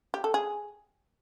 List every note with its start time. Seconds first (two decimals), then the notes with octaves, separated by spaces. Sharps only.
0.14 G4
0.24 A4
0.34 G#4